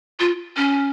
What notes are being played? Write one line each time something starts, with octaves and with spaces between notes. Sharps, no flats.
F4
C#4